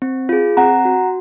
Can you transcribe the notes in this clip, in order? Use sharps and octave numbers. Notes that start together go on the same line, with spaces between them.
C4
F4 G#4
C4 F#5 A#5
F#4